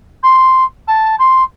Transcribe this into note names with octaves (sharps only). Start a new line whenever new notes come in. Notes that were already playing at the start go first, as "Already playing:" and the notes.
C6
A5
C6